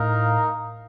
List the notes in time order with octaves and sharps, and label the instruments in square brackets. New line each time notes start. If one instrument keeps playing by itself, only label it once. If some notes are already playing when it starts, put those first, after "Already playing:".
Already playing: [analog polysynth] A2 [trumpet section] D#4 A#4 F5